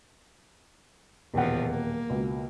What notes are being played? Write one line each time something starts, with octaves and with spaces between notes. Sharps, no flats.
D#1 E2 B2 F3 F#5
A#3
C#2 B2